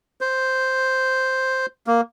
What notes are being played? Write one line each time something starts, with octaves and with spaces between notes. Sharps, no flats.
C5
A#3